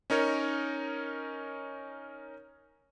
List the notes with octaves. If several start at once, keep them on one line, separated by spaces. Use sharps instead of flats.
C#4 D#4 A#4 C#5